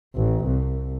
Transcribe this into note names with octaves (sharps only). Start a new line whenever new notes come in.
A1
C2